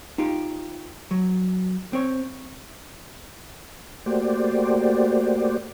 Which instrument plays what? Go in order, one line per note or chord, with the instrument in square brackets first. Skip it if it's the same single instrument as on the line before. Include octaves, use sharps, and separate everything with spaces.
[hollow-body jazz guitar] D#4 F4 G4
F#3
C4 C#5
[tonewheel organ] A3 A#3 F#4 G4 C5 D5